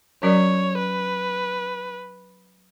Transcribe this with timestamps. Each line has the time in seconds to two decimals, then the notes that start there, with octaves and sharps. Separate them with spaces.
0.23 F#3 C#4 F#4 A#4 C#5 D5
0.78 B4